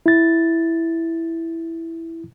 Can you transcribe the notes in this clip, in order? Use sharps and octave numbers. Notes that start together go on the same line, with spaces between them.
E4 A6